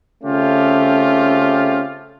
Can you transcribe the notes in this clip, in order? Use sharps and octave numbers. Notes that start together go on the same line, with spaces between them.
C#3 A3 C4 C#4 F4 G4